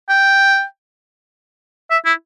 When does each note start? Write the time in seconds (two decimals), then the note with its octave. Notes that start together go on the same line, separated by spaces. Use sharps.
0.09 G5
1.90 E5
2.05 E4